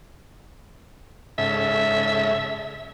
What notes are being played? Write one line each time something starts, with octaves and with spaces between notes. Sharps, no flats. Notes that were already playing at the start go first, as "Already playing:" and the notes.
G#2 C#3 A4 E5